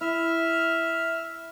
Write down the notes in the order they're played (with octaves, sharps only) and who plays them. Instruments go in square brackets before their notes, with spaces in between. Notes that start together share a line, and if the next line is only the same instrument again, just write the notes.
[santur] E4 [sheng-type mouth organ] E5 F6